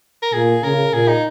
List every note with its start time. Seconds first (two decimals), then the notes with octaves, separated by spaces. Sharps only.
0.23 A#4
0.33 A#2 G#4
0.63 C#3 A#4
0.93 A#2 G#4
1.08 D#4